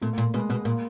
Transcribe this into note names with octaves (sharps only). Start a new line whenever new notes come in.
A#2 A3
A#3
A#2
B2 G#3
B2 G#3
A#2 A#3